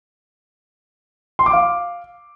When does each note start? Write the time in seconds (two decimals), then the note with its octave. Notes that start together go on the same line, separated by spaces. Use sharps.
1.39 C6
1.46 D6
1.53 F5